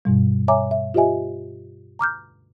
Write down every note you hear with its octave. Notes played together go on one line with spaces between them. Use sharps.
G2 B2 G3
C#5 E5 G#5 A#5 D6
E5
F4 G4 C5 D#5 E5 G#5
A#5 D6 F6 G6